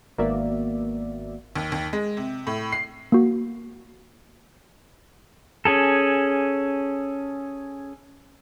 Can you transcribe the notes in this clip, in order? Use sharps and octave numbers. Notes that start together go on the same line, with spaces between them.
G#1 A#3 B3 F#4 D5 E5
D#2
D#2
G#3
C3
A2
C7
A#3 F#4
C#4 G#4 A4